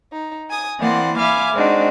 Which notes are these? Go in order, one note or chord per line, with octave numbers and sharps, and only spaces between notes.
D#4
G#5 D#6
E3 A#3 C4 D5 F#5 C6
E5 F5 G#5 B5 D6 F6
G#3 C4 D4 D#4 F#4